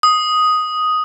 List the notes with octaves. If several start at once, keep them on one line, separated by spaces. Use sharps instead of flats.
D#6